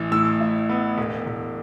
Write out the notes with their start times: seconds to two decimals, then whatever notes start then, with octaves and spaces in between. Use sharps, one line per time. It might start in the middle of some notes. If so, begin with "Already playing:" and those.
Already playing: A1 E3
0.12 A2 E6
0.41 E4
0.69 B3
0.98 E1
1.26 E1